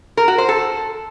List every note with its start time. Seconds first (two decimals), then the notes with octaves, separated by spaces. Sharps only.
0.17 A#4
0.28 F#4
0.38 C5
0.49 A4